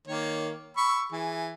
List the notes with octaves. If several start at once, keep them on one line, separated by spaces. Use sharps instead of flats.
D#3 A#3 C#5
B5 C#6 E6
E3 G#4